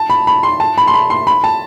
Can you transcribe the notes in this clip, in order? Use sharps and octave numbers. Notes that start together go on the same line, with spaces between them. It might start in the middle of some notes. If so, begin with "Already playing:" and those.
Already playing: A5
B5
B5
C6
A5
B5
C6
B5
C6
B5
A5